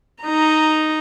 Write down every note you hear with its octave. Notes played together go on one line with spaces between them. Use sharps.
D#4 A#5